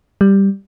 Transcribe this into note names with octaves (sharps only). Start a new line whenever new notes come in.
G3